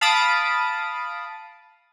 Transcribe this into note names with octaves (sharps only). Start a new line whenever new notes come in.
F5 A5 B5 D#6 A6 D7